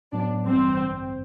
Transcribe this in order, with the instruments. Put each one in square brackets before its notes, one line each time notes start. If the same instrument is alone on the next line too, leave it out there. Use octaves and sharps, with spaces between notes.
[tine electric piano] A2 F#3 B3 [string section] D4
[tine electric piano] A1 G2 E3 G3 [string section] C4
[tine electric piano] A1 G2 D3